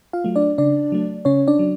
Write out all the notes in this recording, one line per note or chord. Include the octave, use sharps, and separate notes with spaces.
F4 F5
F#3 A3
D4 D5
C#3 D4 D5
F#3 A3
C#3 C#4 C#5
D4 D5
F#3